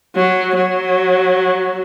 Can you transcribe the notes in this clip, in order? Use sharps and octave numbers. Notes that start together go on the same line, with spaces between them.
F#3
F#3